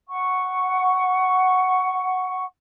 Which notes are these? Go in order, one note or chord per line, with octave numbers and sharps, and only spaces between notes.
F#5 C#6